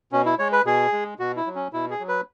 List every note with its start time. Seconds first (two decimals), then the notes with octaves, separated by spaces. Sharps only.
0.12 B2 C#4
0.26 E4
0.39 G#3 C#5
0.52 B4
0.65 B2 G#4
0.93 G#3
1.19 B2 F#4
1.37 E4
1.46 F#3
1.55 C#4
1.73 B2 E4
1.90 G#4
2.00 F#3
2.08 B4